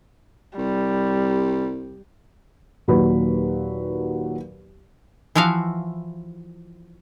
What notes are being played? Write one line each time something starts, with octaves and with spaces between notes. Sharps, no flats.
C2 G3
D#2 A#2 D#3 F#3 B4 B5
E3 F3 E4 F#4 F5